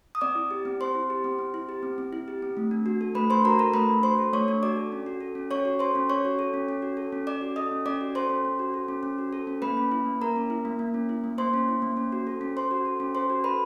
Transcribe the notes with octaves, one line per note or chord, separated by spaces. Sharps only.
D#6
C4 D5 D6
E4
G4
C4
C4 C5 C6
E4
G4
C4
C4
E4
G4
C4
C4
E4
G4
C4
A3
D4
F#4
A4
A3 B4 B5
D4 C5 C6
F#4 A#4 A#5
A4 A#4 A#5
A3 B4 B5
D4
F#4 C5 C6
A4
A3 C#5 C#6
D4
F#4 D5 D6
A4
C#4
F#4
A4
C#4
C#4 C#5 C#6
F#4
A4 C5 C6
C#4
C#4 C#5 C#6
F#4
A4
C#4
C#4
F#4
A4
C#4
C#4 D5 D6
F#4
A4 D#5 D#6
C#4
C#4 D5 D6
F#4
A4 C5 C6
C#4
C#4
F#4
A4
C#4
C#4
F#4
A4
C#4
A#3 B4 B5
C#4
E4
A#3
A#3 A#4 A#5
C#4
E4
A#3
A#3
C#4
E4
A#3
A#3 C5 C6
C#4
E4
A#3
C#4
F#4
A4
C#4
C#4 C5 C6
F#4
A4
C#4
C#4 C5 C6
F#4
A4 B4 B5